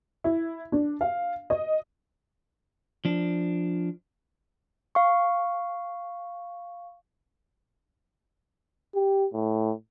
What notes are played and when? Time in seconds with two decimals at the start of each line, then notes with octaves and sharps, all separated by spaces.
0.24 E4
0.72 D4
1.01 F5
1.50 D#5
3.05 F3 D4
4.95 F5 C#6
8.95 G4
9.33 A2